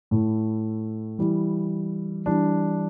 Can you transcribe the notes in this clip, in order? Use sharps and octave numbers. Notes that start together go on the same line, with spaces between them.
A2 A3 E4
E3 G3 E4
E3 G3 D4